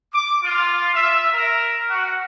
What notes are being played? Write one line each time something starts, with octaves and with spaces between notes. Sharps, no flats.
D6
F4
E5
A#4
F#4